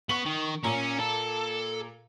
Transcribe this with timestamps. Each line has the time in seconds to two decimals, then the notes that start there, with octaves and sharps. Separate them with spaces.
0.09 B3 C#6 F#7
0.26 D#3
0.64 A#2 C#4 A#5
1.00 A4